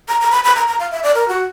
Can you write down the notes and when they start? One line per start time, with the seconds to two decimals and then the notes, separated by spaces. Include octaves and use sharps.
0.09 A#5
0.21 A#5
0.31 B5
0.44 B5
0.56 A#5
0.68 A#5
0.80 F5
0.92 E5
1.03 D5
1.15 A#4
1.28 F#4